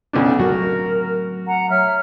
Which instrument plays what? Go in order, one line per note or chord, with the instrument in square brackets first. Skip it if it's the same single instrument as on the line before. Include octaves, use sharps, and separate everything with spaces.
[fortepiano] B1 C#3 D4
[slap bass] F#3 A3 C4 [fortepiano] F#4 [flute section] A#4
[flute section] F#5 A#5
C#5 E5 F6